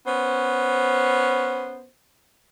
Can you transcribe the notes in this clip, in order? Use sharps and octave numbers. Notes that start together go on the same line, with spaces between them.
B3 C#4 C5